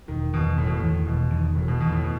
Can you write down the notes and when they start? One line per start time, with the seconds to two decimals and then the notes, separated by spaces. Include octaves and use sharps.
0.08 E1 D#3
0.33 E2 B2 D#3
0.58 E1 A2
0.67 B2
0.76 A2
0.82 E2 D#3
1.06 E1 B2
1.30 E2 D#3
1.55 E1 A2
1.68 B2
1.80 E2 B2 D#3
1.92 A2
2.04 B2